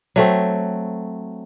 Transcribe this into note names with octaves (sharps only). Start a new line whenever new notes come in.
F#3 A3 C4